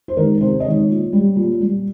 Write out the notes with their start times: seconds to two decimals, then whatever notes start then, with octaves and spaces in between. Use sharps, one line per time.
0.08 C5
0.17 D#3 G#3 A#4
0.41 C3 C5
0.60 D#5
0.64 D#3 G#3 C#5
0.89 A#2
1.13 G3
1.36 A#2
1.60 G3